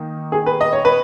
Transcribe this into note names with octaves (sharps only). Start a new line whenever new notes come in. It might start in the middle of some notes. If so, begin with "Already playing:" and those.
Already playing: D#3 A#3 D#4
G#4
B4
D#5
C#5
B4